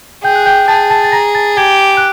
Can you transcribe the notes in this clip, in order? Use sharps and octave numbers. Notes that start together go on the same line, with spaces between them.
G#4 G5 G6
F#6
G5 G6
G#4 A5 A6
A5 A6
A6
A#5 A#6
A5 A6
G4 G#5 G#6
F#6